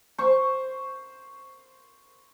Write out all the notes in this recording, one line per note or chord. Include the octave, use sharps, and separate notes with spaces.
C5 C#6